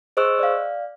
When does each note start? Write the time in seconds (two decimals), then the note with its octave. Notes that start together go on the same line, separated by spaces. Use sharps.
0.17 G#4 C5 D#5 C#6 E6 F#6
0.39 D5 F5